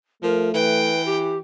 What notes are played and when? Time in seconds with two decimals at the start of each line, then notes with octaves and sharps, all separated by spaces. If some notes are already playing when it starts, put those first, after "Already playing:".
0.23 F3 A3 A#4
0.54 E3 B4 G5
1.06 G4